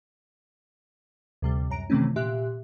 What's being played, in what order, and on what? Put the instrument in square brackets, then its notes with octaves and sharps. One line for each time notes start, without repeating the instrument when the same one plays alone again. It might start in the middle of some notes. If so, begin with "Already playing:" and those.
[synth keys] D2 C3 G3
F#2 A#5 D7
C3 D#3 E3 A3 C4 C#4
A#2 G4 E5 C6 F#6